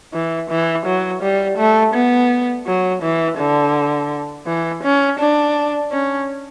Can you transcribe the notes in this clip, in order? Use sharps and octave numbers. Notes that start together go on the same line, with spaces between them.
E3
E3
F#3
G3
A3
B3
F#3
E3
D3
E3
C#4
D4
C#4